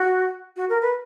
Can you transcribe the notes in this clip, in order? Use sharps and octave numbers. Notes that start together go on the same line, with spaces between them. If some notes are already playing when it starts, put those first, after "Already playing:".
Already playing: F#4
F#4
A#4
B4